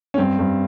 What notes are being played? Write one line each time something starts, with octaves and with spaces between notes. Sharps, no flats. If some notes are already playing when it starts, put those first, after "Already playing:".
C#4
G2 C4
G2